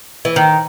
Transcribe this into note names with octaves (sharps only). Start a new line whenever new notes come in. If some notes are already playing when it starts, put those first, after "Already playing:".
E3
D#3